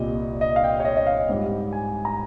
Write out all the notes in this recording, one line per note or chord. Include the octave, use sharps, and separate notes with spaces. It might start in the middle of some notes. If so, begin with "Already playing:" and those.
Already playing: C2 A#2 G3 D#5
D#5
F5
G5
C#5
D#5
D#5
F5
G#2 G3
G#5
A#5